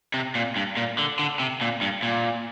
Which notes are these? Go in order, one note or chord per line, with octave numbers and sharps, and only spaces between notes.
C3
A#2
G2
A#2
D3
D3
C3
A#2
G2
A#2